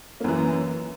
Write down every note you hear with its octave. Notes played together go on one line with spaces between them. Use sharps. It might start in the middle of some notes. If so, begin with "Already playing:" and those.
F#2 E3 A#3